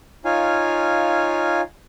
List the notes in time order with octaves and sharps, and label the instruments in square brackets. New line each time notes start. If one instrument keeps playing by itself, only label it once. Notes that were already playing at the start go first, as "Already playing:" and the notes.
[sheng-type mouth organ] D#4 F4 C#5 F5 G#5